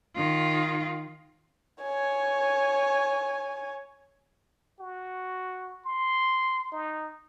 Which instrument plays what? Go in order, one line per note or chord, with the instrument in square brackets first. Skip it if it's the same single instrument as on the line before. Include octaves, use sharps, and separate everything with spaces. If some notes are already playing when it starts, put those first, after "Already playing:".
[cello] D#3 F4
[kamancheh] C#5 G#5
[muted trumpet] F#4
C6
D#4